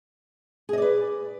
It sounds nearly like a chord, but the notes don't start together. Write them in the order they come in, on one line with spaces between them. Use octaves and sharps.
G#4 D#5 D5 B4